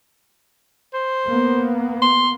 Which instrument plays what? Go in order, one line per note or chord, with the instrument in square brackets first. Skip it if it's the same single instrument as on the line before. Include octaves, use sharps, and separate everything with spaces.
[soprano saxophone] C5
[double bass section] A#3 B3
[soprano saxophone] C6